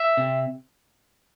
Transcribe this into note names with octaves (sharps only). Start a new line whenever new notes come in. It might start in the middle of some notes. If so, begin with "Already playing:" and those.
Already playing: E5
C3